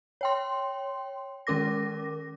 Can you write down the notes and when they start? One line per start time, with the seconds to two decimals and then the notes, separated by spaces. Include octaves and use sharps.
0.21 C#5 G5 C6
1.47 D#3 G#3 C#4 A#4 D6 A#6